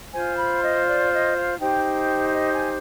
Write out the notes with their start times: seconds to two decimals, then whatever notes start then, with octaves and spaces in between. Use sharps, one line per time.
0.13 F4 C5 G#5
0.38 B5
0.63 D#5
0.87 D5
1.12 D#5
1.36 F5
1.60 D#4 G4 C5 G5
2.34 D#5
2.52 G#5